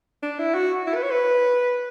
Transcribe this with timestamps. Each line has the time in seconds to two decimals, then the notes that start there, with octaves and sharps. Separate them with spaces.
0.23 D4
0.39 E4
0.54 F#4
0.87 E4
0.95 B4
1.03 C#5
1.11 B4